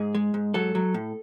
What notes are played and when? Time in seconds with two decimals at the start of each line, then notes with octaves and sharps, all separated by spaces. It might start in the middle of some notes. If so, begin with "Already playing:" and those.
Already playing: G#2 G#4
0.15 G#3
0.34 G#2
0.54 F#3 A4
0.75 F#3
0.94 A2